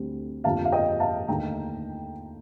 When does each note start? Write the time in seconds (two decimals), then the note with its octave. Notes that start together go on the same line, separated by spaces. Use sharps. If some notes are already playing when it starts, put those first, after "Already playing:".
Already playing: D2 D3 G3 C4
0.44 G1 F2 D3 G3 A#3 F5 A5
0.65 F5
0.72 D#5 G5
1.00 F5 A5
1.28 D#2 D3 A3 D#4 G5 A#5